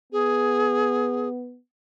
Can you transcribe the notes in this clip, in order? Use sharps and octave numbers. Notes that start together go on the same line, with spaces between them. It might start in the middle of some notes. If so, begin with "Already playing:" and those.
B3 G#4